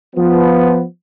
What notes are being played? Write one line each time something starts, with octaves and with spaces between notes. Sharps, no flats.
F3 B3